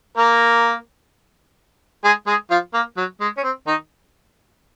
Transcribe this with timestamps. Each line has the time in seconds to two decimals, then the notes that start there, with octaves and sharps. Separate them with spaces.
0.17 A#3 A#4
2.04 G#3 G#4
2.27 G#3 G#4
2.51 F3 F4
2.74 A#3
2.97 F#3
3.21 G#3
3.37 C#4
3.44 C4
3.67 D#3 D#4